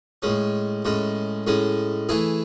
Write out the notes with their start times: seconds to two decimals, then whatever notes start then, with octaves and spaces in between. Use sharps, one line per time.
0.22 A2 G#3 C#4
0.85 A2 G#3 C#4
1.47 A2 G#3 C#4
2.09 E3 A3 E4 G#4